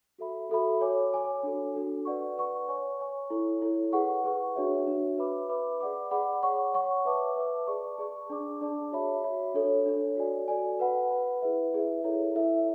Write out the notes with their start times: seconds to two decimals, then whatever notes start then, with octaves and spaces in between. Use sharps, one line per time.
0.19 F#4 A4 E5 B5
0.50 F#4 A4 E5 B5
0.81 C#5 G#5 D6
1.12 C#5 G#5 D6
1.43 D4 F#4 A4
1.74 D4 F#4 A4
2.05 B4 D5 F#5 C#6
2.37 B4 D5 F#5 C#6
2.68 C#5 G#5 C#6
2.99 C#5 G#5 C#6
3.30 E4 A4 C#5
3.62 E4 A4 C#5
3.93 G#4 B4 F#5 C#6
4.24 G#4 B4 F#5 C#6
4.55 D4 F#4 C#5 E5
4.87 D4 F#4 C#5 E5
5.18 B4 E5 B5 D6
5.49 B4 E5 B5 D6
5.80 G#4 D5 F#5 B5 D6
6.11 G#4 D5 F#5 B5 D6
6.42 C#5 F#5 C#6
6.74 C#5 F#5 C#6
7.05 B4 E5 A5 D6
7.36 B4 E5 A5 D6
7.67 G#4 D5 A5 C#6
7.98 G#4 D5 A5 C#6
8.30 D4 G#4 D5 A5 D6
8.61 D4 G#4 D5 A5 D6
8.92 F#4 C#5 E5 B5
9.24 F#4 C#5 E5 B5
9.54 D4 A4 C#5
9.86 D4 A4 C#5
10.17 F#4 A4 D5 G#5
10.48 F#4 A4 D5 G#5
10.79 B4 F#5 B5
11.10 B4 F#5 B5
11.42 E4 G#4 B4 E5
11.73 E4 G#4 B4 E5
12.04 E4 A4 C#5 E5
12.35 E4 A4 C#5 E5